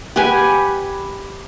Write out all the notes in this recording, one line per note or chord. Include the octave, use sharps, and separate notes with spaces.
G4 B4 F#5 G#5